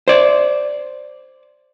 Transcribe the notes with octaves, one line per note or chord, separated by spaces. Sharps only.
C5 D5